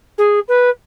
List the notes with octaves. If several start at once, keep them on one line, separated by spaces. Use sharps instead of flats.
G#4
B4